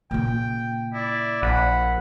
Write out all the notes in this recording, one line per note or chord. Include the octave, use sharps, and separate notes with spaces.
A#2 C#3 G5
E4 D5
A#1 F#5 B5